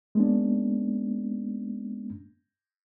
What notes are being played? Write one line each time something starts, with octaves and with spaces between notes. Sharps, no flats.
G#3 A#3 B3 C#4 D4